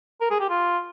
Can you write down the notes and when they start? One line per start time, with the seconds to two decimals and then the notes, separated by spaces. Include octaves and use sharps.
0.21 A#4
0.30 G#4
0.40 G4
0.50 F4